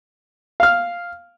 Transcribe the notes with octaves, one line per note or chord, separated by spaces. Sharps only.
F5 F6